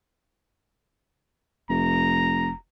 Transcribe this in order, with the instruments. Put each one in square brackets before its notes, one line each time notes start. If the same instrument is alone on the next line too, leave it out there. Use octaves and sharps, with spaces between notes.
[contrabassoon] F1 [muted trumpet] A#5